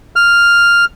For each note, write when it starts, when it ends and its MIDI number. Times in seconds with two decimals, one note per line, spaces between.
0.16 0.85 89